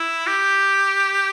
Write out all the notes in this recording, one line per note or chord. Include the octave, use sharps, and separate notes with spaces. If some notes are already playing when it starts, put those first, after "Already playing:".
Already playing: E4
G4